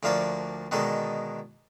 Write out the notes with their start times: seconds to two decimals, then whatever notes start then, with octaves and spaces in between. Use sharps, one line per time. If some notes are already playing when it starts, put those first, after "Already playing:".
0.03 D2 D3 F3 A#3 C#5 D5
0.71 B2 D3 D#3 G#3 A4